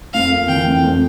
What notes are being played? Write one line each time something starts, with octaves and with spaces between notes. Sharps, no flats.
F2 F5
A#3
E3 G5
F2
F2